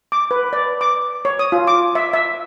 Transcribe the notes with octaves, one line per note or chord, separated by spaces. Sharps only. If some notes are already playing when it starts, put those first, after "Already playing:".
D6
B4
D5
D6
C#5
D#6
F4
D6
E5
E5